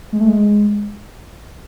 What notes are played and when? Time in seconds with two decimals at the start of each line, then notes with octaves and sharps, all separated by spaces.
0.13 G#3
0.21 A3
0.29 G#3